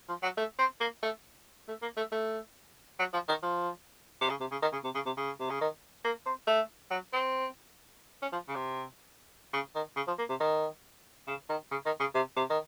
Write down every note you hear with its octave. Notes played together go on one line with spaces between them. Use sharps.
F3
F#3
A3
C4
A#3
A3
A3
A#3
A3
A3
F#3
F3
D#3
F3
C3
C#3
C3
C#3
D#3
C#3
C3
C#3
C3
C#3
C3
C#3
D#3
A#3
C4
A3
F#3
C4
C#4
F3
C#3
C3
C#3
D#3
C#3
F3
A#3
C3
D#3
C#3
D#3
C#3
D#3
C#3
C3
C3
D#3